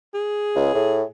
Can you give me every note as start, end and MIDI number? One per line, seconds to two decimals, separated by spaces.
0.14 1.09 68
0.56 0.73 37
0.75 1.03 45